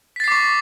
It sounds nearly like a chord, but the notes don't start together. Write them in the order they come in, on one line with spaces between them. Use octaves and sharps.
B6 A6 C7 D6 C#6